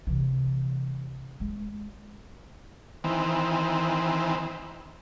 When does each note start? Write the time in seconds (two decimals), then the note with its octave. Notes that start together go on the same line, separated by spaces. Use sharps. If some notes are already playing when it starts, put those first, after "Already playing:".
0.07 C3 E3
1.40 G#3
3.04 D#3 E3 C4